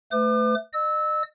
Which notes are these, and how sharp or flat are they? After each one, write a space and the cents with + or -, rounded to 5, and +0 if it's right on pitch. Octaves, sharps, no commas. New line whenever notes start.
A3 +0 B4 +40 D6 +40
D#5 -40 E6 -20